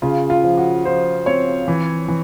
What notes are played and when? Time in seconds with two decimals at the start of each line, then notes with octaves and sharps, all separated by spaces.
0.02 C#3 F4
0.30 F4
0.44 F3
0.57 F#4
0.85 F3 C5
1.26 C4 C#5
1.68 E3
2.08 E3